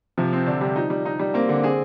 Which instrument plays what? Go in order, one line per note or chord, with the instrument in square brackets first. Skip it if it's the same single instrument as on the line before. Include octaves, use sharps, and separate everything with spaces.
[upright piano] C3 [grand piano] F3
[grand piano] C4
[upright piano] D3 [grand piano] D4
[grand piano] G3
[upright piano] F3 [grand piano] D#4
[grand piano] G3
D#4
G3
[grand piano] A#3 [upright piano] C4
[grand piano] D3
[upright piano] C4 [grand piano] G#4